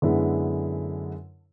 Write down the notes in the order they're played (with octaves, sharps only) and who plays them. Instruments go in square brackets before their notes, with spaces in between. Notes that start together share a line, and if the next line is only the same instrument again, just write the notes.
[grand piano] F#2 D3 G#3 B3 E4